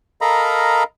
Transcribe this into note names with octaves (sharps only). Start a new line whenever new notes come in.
A4 A#4 D#5 F5 A#5 B5